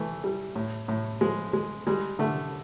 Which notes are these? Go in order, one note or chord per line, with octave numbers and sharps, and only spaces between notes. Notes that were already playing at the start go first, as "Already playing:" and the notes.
Already playing: E3 A3
G3
A2
A2
F3 G#3
G#3
G3 G#3
D3 A3